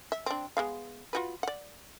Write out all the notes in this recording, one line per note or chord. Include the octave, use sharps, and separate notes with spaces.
E5
C4 D4
G#3 B3 F5
F4 F#4 B4
D5 F#5